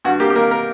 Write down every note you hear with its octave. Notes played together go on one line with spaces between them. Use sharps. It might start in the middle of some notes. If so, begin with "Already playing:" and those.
G2 F#4
A#3 G4
G4
A#3 A#4
A#4